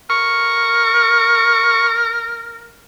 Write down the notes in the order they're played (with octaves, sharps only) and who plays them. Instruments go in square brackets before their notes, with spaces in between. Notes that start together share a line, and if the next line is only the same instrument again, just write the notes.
[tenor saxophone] A#4 [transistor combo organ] C#6